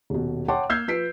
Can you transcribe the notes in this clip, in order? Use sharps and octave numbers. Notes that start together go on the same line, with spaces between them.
D#1 B2
C#5 F#5 G5 A5 C6 D6
A#3 E6 F6 G6 G#6 C7
F3 B4 B6 C7 D7